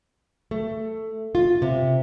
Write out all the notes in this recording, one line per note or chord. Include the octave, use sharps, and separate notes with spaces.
A3
F4
C3